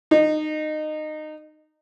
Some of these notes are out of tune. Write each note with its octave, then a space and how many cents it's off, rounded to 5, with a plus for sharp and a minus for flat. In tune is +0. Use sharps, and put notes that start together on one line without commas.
D#4 -20